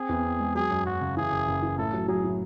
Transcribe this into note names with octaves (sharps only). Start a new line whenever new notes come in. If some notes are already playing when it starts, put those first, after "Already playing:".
Already playing: C4 G#4
E2
C4
G#3
F#3 G#4
F#2
F#2 F#4
C#3
E3 G#4
F#1
F#1
E3
A2 A4
F#3
F#3 G#4
A2